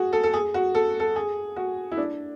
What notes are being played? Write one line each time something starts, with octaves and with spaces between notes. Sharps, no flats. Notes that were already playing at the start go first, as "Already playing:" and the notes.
Already playing: F#4 G#4
A4
A4
G#4
F#4
A4
A4
G#4
F#4
E4
D4